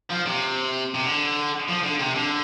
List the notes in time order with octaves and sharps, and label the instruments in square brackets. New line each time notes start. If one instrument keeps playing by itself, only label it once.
[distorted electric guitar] F3
C3
C3
D3
F3
D3
C3
D3